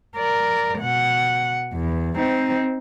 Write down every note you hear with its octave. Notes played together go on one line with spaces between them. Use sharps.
A#4 D5
B2 F#5
E2
C4 D#4